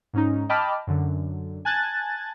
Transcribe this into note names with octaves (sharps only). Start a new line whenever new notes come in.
G#2 C#4 D#4
D#5 G5 A5 B5 D6 F6
F#2 D3
G#5 A5 F#6 G#6 A6